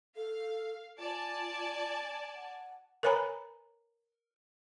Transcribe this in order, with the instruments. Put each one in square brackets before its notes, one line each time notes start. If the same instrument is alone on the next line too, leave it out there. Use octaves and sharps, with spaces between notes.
[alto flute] A4 [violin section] F5
[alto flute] F4 [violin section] D5 G#5 A5
[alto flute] F#5
[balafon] A#4 B4 C#5 G#5 A#5 B5